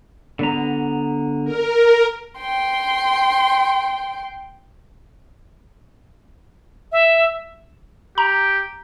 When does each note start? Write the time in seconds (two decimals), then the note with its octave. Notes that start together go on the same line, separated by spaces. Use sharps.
0.39 D3 B3 A#5
1.44 A#4
2.37 G5 C6
6.92 E5
8.18 G4 A#5